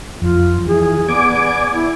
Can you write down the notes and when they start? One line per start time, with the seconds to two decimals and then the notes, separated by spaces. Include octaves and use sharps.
0.21 F2 F4
0.67 E3 G#4
1.09 B3 D5 G#5 D6
1.73 E4